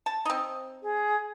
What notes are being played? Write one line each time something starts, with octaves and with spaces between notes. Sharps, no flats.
A5
C4 D#4
G#4